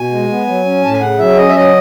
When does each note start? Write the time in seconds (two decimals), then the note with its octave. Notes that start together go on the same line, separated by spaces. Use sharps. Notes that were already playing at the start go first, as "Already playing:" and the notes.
Already playing: B2 G#5
0.11 G#3
0.29 B3
0.47 F#3
0.65 C#4
0.83 A2 A5
0.93 G#5
1.00 C#3 F#5
1.18 F#3 E5
1.37 C#4 D#5
1.49 E5
1.54 F#3 D#5